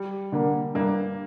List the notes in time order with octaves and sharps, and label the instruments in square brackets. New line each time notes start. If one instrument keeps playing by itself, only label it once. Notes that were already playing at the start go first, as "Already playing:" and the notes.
Already playing: [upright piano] G3
[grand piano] D3 A#3
[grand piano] G2 [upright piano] A#3